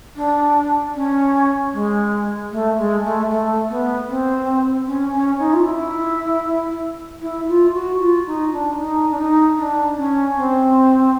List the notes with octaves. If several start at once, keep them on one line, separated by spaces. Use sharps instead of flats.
D4
C#4
G#3
A3
G#3
A3
A3
B3
C4
C#4
C#4
D#4
F4
E4
E4
F4
F#4
F4
D#4
D4
D#4
D4
D#4
D4
C#4
C4